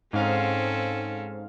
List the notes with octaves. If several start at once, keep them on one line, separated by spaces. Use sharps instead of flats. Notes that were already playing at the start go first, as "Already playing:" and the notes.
G#2 C4 C#4 A4 F5